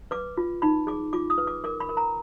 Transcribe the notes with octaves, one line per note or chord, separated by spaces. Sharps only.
B4 D6
F4
D#4 B5
G#4 D6
F4 D6
D#6
B4
D6
A#4 D6
B5
A#4
A#5